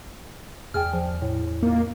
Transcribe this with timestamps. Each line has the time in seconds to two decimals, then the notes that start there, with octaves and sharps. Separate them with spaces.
0.74 E2 G#4 D5 G5 F6
0.93 F3
1.22 A2
1.63 A#3 D#4 F4